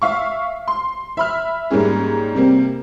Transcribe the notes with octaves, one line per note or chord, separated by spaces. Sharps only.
E5 F5 C#6
C6
E5 B5 F6
G#2 G3 A#3 C#4 G#4
C3 G3 A#3 C4